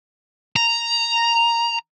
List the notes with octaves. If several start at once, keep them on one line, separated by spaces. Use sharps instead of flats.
A#5